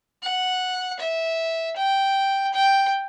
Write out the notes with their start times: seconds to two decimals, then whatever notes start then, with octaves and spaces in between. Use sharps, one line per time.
0.23 F#5
1.00 E5
1.76 G5
2.54 G5